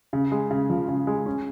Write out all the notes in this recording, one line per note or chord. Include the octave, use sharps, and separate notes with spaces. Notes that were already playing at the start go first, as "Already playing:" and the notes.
C#3
G#3
C#3
F3
C#3
G#3
C#4